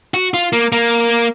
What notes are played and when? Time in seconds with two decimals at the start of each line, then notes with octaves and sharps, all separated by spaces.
0.14 F#4
0.34 F4
0.53 A#3
0.72 A#3